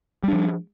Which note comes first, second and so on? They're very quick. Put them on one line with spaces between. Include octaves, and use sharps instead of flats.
G3 D4 F3